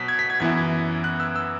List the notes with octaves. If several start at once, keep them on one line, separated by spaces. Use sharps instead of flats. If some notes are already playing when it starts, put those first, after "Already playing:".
Already playing: B2 F#3 B6
G#6
B6
G#6
F#2 E3 B3 E4 G#6
F#6
E6
E6